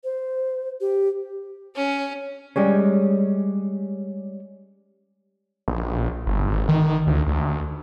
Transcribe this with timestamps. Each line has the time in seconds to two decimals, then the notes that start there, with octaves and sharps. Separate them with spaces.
0.04 C5
0.81 G4
1.75 C#4
2.56 G3 G#3 C#4
5.68 A#1
6.26 G1
6.48 G#1
6.69 D#3
7.07 D2
7.26 D2